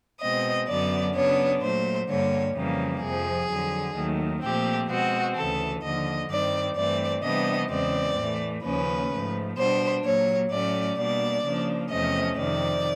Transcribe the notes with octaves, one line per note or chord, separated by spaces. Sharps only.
B2 G#3 C4 D#5
F#2 D3 F#3 B3 D4 D5
C#3 F#3 B3 D4 C#5
A#2 F#3 A3 C5
G2 D3 G3 A#3 C#5
F2 C#3 E3 G3 A#3
F2 C3 F3 G#4
F2 D3 F#3
D#2 D#3 F#3 A3
A#2 F3 A3 C4 G4
B2 G#3 C4 F#4
D2 C#3 E3 A4
D#2 D3 F3 D#5
G2 D#3 G3 C4 D5
G2 E3 A3 C4 D5
C3 E3 G3 B3 D4 D#5
E2 C#3 E3 G#3 C4 D5
A2 E3 A3
D#2 C#3 F3 A#3 C#4 B4
G#2 F3 A3
B2 G3 B3 D4 C5
A#2 F#3 A#3 C#5
A2 F#3 A3 C#4 D5
B2 G3 A#3 D4 D5
C#3 F3 A#3 D4
E2 C3 F3 A3 C#4 D#5
F2 C3 D#3 D5